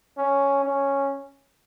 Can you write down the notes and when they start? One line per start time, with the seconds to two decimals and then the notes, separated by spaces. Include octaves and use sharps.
0.18 C#4
0.64 C#4